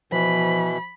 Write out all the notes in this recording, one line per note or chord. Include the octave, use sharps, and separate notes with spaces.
B2 E3 F3 B5